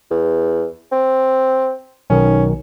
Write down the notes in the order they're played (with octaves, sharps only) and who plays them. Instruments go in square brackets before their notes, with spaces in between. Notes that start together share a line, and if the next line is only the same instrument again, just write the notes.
[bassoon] E2
C4
[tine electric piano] B1 D#3 [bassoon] C#4